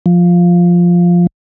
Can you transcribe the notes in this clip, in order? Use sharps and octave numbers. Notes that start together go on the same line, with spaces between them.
F3